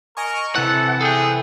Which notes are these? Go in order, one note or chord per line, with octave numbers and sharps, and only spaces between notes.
A#4 D#5 G#5 C#6
C3 E3 A4 F#5
G#4 A4 G5